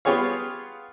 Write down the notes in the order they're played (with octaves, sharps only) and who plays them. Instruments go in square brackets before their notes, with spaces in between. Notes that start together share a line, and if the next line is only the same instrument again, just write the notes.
[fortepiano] B3 F4 G4 G#4 C#5 F5